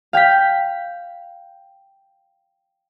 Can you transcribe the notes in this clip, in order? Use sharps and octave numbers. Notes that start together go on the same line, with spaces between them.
F5 G5 G6 B6